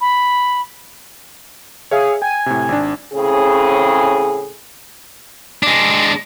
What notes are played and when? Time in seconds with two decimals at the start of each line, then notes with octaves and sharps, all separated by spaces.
0.01 B5
1.91 G#4 C#5 E5 F5
2.22 G5 G#5
2.46 A2 C3
2.69 G#1 D4
3.13 A2 C#3 C4 G#4
5.63 G#3 D4